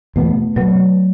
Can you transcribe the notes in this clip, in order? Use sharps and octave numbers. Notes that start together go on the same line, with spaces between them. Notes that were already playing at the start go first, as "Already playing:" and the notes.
E2 B2 A3 B3
B2 F#3 B3